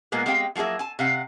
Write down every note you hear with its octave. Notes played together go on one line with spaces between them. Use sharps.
A#2 G#3 A#3 B3
G#3 C4 G4 F5 G5
F3 F#3 A#3 G#4 E5
G#5 A5
C3 F5 F#5